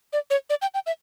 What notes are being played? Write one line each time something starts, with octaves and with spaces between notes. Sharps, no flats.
D5
C#5
D5
G5
G5
E5